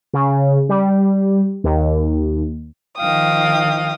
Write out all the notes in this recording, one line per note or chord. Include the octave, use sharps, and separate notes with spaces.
C#3
G3
D#2
D#3 F3 F5 G5 D#6